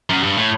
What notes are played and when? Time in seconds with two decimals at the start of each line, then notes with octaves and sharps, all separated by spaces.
0.10 F#2
0.23 G2
0.37 A2